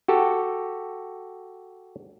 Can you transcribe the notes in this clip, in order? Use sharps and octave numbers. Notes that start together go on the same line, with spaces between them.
F#4 G4 A4 A5